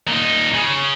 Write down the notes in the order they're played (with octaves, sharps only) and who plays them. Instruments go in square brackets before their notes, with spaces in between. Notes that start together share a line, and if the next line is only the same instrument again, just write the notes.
[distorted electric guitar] A#2 D#4
C#3